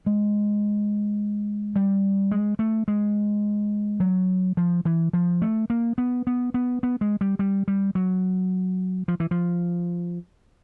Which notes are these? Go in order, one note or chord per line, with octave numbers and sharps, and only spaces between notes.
G#3
G3
G#3
A3
G#3
F#3
F3
E3
F3
A3
A#3
B3
B3
B3
B3
G#3
G3
G3
G3
F#3
F3
E3
F3